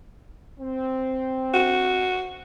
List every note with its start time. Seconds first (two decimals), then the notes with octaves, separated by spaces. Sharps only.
0.59 C4
1.53 F#4